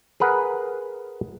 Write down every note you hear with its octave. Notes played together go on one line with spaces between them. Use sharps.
G#4 A#4 B4 F#5